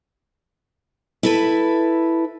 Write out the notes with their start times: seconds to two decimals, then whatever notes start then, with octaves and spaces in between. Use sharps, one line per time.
1.23 E4 A4 B4